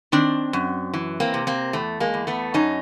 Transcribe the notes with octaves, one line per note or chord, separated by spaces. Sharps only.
D#3 C4 D4
F#2
E3
A#3 C4
C3
A#3 C4
E2 A3
G#3 A#3
E2
A3 B3
F#2 C#4 D#4